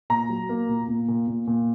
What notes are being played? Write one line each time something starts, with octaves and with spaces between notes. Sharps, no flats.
A#2 A#5
F#3
A#3
A#2
A#2
A#2
A#2
A#2